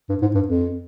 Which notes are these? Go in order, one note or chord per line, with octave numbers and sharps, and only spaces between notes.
G2
G#2
G2
F2